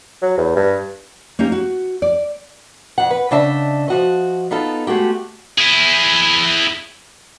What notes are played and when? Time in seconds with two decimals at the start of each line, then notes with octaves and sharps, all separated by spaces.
0.22 F#3
0.37 E2
0.56 G2
1.39 A#3 C#4 D#4 G4
1.52 F#4
2.02 D5
2.98 F2 F#5
3.11 B4
3.31 C#3 D4 D#5 E5 A5
3.88 F3 F#4 D#5
4.51 B3 D#4 F4 A4
4.87 G#3 A3 F#4 G4
5.58 E4 G#4